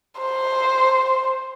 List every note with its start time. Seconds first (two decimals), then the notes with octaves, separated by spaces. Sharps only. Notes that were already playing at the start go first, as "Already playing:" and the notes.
0.21 C5